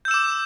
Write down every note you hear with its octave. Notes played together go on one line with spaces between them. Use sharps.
D6 E6 G6 E7